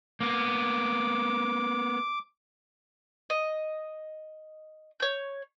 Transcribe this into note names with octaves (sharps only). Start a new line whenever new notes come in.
A#3 B3 D6
D#5
C#5 G6